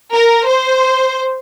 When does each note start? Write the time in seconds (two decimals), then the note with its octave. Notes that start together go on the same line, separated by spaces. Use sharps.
0.13 A#4
0.46 C5